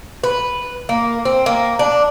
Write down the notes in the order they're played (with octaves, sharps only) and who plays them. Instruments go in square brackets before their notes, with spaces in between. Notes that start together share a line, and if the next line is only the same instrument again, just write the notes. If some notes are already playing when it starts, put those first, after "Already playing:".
[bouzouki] B4
A#3
C4
A#3
D4